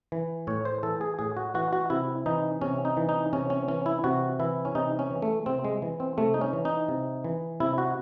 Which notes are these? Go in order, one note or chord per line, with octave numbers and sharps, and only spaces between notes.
E3
A2 C#5
C5
E3 A4
G#4
A2 G#4
F#4
E3 F#4
F#4
C3 E4
E3 D#4
C3 C#4
D#4
E3
D#4
C3 C#4
C#4
E3 C#4
E4
C3 F#4
E3 E4
C#4
C3 D#4
C#4
E3
A3
C3 C4
G#3
E3
C4
C3 A3
D#4
C#4
E3
D#4
C3
E3
C3 E4
F#4